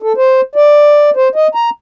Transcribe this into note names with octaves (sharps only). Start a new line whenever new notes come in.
A4
C5
D5
C5
D#5
A#5